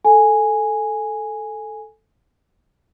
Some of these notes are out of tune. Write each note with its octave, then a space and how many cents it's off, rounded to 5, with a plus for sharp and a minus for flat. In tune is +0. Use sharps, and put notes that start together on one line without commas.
A4 +0 G#5 +0